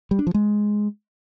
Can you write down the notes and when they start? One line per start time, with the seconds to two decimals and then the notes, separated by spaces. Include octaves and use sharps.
0.11 G3
0.19 D4
0.27 F3
0.34 G#3